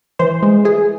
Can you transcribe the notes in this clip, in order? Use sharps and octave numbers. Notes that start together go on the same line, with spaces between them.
E3 C5
G#3
E3 G#4